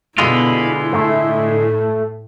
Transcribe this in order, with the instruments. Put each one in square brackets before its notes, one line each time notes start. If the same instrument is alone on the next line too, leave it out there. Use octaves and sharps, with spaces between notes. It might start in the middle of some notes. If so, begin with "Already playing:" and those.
[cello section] B2 [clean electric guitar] D3 G#3 F4 [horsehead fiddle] E4 [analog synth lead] B5
[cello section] A2 [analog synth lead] A3